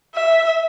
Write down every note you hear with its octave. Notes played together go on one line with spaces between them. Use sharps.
E5